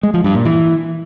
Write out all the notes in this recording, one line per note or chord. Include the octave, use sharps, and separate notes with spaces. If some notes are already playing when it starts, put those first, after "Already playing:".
G#3
F3
G2
A#2
E3